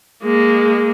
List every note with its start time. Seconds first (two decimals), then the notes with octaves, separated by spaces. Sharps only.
0.23 G#3 A#3